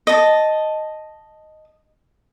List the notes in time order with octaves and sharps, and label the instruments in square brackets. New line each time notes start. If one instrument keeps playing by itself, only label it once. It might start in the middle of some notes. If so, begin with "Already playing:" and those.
[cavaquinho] D#5 A5